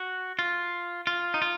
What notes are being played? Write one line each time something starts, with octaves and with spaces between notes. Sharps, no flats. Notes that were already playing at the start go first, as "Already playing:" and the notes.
Already playing: F#4
F4
F4
D#4
F4